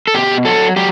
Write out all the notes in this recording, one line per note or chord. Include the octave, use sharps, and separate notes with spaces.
A4
B2 G4
F#3 A4
F#3 G4